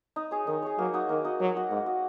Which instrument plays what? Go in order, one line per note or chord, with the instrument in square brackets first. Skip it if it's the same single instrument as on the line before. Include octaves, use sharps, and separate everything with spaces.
[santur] D#4
G#4 C#5
[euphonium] D#3 [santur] D#4
[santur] G#4 C#5
[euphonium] F#3 [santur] A#3
[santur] D#4 F#4
[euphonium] D#3 [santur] A#3
[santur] D#4 F#4
[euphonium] F#3 [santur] A#3
[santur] F#4 D#5
[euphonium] G#2 [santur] A#3
[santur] F#4 D#5